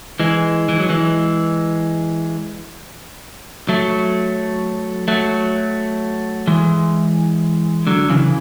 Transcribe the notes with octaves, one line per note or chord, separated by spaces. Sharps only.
E3 G#3
E3
F#3
E3 G#3
F#3 A3
F#3 A3
E3 G#3
D3 F#3
C#3 E3